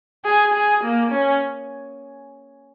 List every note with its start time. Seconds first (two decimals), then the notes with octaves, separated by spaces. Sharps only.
0.25 G#4
0.53 G#4
0.83 A#3
1.11 C#4